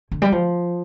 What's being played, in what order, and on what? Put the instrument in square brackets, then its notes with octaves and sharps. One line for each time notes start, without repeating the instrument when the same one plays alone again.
[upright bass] D3
G3
F3